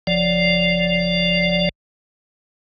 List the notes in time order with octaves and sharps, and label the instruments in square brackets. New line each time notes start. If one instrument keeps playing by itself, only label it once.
[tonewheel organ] F#1 F3 D5